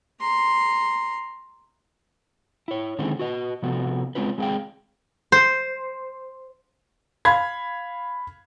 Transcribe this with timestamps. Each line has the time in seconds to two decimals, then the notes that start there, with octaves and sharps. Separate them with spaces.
0.21 A#5 C6
2.68 E4 C#5
2.99 D3 D#3 G#3 C4 C#4 E4
3.19 F#4 B4 D#5
3.62 C3 F3 B3 F#4 A4
4.15 G#3 C4 C#4 F4 B4
4.38 G#3 C4 G#4 D5 F5 G5
5.32 C5
7.25 F5 B5 G#6